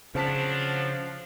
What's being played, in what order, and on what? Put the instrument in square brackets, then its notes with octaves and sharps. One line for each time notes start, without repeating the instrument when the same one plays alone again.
[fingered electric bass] C#3 [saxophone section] F3 [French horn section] F#3 D4 [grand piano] C4 A5 B6